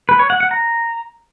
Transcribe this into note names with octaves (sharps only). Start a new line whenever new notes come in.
B4
C#5
F#5
F#5
A#5